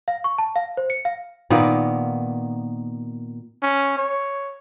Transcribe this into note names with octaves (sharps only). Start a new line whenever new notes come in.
F5
C#6
A5
F5
C5
C#7
F5
A#2 D#3 A#3 B3
C#4
C#5